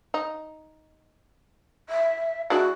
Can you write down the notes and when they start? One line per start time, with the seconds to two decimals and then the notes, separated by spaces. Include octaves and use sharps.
0.14 D#4
1.89 E5
2.50 G#3 D4 E4 F#4